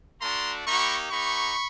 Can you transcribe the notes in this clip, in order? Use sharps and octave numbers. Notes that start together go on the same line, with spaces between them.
A3 D4 F#4 A#5 C6
A#3 D#4 G4 B5 C#6
A#3 D#4 G4 B5 C#6